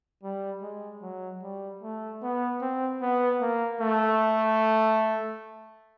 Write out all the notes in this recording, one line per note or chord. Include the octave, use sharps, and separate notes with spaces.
G3
G#3
F#3
G3
A3
B3
C4
B3
A#3
A3